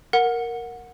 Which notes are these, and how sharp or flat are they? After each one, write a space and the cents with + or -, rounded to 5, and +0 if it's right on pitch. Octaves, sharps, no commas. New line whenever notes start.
A#4 +0 F#5 -15